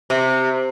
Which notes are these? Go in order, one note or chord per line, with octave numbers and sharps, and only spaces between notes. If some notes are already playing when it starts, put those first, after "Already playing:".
C3